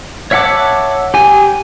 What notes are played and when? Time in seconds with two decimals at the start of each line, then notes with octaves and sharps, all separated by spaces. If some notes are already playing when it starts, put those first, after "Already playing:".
0.31 C#5 E5 F#5 A5 D6
1.14 G4 G#5